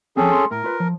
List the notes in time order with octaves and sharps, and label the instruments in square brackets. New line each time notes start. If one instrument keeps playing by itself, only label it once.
[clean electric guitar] F3 C4 [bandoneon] C#4 G#4 A4
[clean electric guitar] C6
[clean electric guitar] A2 [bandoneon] A#4
[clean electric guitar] F4 B4
F3